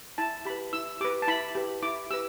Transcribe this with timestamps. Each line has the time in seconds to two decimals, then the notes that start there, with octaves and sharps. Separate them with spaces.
0.18 E4 A5
0.45 G4 B5
0.50 B4
0.73 E4 E6
1.01 G4 D6
1.04 B4
1.22 A5
1.28 E4 B5
1.55 G4 B4
1.83 E4 D6
2.11 G4 B4 E6